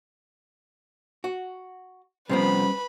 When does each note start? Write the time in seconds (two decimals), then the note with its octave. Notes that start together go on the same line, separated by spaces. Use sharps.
1.24 F#4
2.29 C3 F3 G3 B3 C#4 B4 C5 B5